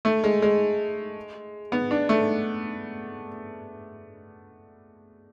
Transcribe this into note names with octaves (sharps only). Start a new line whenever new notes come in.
A3
G#3
G#3
B3
D4
A3